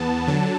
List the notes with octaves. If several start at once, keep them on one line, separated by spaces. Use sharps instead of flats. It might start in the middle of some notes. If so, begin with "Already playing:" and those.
Already playing: E2 B3 A5
D3 F#3